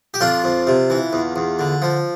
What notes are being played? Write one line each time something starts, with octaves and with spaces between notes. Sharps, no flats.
G4
F2 D4 F4
F2
C3
E3
E2
E2
D3
F3